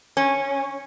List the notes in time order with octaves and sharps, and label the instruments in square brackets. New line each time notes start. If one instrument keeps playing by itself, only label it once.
[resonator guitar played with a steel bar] C#4